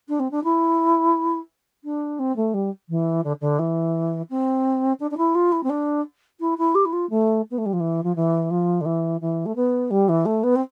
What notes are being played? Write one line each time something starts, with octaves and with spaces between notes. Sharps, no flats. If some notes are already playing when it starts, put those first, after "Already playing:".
D4
C4
D4
E4
D4
C4
A3
G3
E3
D3
D3
E3
C4
D4
D4
E4
F4
E4
C4
D4
E4
E4
G4
E4
F4
A3
B3
A3
G3
F3
E3
F3
E3
F3
D3
E3
E3
A3
B3
G3
E3
A3
B3
C4